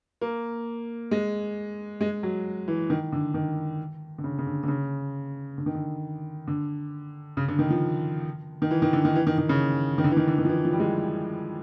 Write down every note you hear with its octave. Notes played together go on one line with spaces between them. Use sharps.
A#3
G#3
G#3
F#3
E3
D#3
D3
D#3
D3
C#3
C#3
D3
D3
C#3
D3
D#3
D3
D3
C#3
D3
D#3
F3
D#3
E3
D#3
D3
D#3
E3
D#3
D#3
C#3
D#3
D3
E3
D#3
D3
D#3
F3
E3
F3
G3
G#3